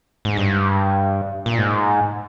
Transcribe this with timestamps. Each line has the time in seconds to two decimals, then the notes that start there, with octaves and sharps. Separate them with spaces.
0.25 G#2
0.37 G2
1.46 A#2
1.58 G#2